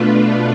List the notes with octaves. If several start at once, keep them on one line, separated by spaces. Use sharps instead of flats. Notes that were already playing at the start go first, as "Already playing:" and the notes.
Already playing: B2 A3 D4 F4 B4